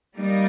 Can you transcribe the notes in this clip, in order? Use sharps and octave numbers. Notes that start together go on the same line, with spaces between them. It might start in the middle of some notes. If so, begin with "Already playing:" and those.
G3 A#3 D#4